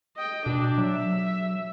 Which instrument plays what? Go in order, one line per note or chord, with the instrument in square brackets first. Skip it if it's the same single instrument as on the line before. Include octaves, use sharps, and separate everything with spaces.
[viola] D#5 G5
[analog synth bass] B2 [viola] D4
[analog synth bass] F#3 [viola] E5